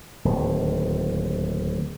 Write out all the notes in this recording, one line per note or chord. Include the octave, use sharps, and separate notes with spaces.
D1 D#2